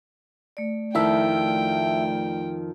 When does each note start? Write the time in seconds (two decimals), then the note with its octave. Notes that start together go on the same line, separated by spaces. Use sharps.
0.57 A3 D5
0.95 F2 D#3 F3 E4 E5 G5